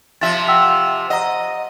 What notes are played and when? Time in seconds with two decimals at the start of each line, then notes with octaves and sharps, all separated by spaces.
0.21 C3 F3 E5 A6
0.48 F#5 G5 E6
1.10 D#5 F#5 A#5